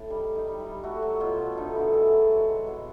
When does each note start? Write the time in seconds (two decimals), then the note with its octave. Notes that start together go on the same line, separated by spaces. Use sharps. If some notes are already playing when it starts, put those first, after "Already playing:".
Already playing: A2
0.10 G3 D#4
0.28 G3
0.35 D#4
0.48 G3
0.60 E4
0.66 G3
0.83 A3 F#4
1.03 F#3
1.20 B2 F4
1.39 B2
1.57 D3 D#4
1.75 D3 E4
1.94 A3 G#4
2.07 G#4
2.12 F#3 G4
2.30 G#3 F#4
2.49 G#3
2.67 B2